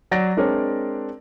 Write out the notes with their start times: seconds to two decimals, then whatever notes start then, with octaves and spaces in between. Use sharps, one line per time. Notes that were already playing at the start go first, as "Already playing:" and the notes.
0.11 F#3 D5 A6 A#6 D7
0.37 G#3 C4 D4 A#4 C#5 D5